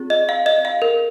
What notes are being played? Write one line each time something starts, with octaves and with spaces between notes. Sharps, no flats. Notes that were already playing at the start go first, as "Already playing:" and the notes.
Already playing: C4 F4 G#4
D#5
F5
D#5
F5
A#4